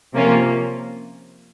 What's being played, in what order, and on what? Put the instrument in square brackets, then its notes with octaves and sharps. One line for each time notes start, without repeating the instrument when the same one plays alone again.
[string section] C3 F3 A#3 C#4 F4